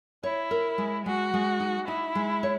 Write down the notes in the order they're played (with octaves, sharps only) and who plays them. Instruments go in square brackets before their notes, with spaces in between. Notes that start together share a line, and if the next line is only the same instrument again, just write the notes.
[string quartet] E4 [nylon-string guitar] C#5
[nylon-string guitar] A#4
G#3
[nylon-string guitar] G#3 [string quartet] F#4
[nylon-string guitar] G#3
D#4
[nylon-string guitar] D#4 [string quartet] E4
[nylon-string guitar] G#3
C#5